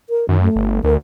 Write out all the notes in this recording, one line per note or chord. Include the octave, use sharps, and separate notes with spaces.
A#4
F#2 D#3
A3
G1
D2 A#4